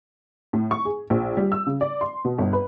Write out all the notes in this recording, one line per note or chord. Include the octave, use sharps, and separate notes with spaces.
A2
C#6
G#4
A#1
G3
E6
C#3
D5
C6
B2
G1
B4